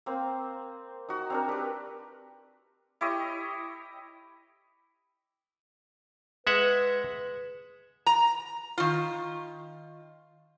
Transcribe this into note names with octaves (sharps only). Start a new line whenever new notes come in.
A#3 C4 C5
D#4 F#4
C4 D4 A#4
G4 B4
E4 G4 C#5 D#5
G#3 B4 E5 F#5
A#5
D#3 F4